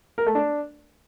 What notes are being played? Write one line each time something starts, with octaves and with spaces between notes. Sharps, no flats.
A#4
A3
D4